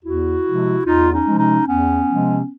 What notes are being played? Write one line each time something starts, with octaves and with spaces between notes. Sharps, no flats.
E2 E4 F#4
C3 F3 G#3
E2 D#4 F4
C#4 D#4
C3 F3 G#3
C#4 D#4
E2 B3 C#4
C3 F3 G#3